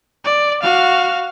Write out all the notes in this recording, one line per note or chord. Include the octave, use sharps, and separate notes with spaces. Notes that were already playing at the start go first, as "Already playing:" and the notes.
D5
F#4 F5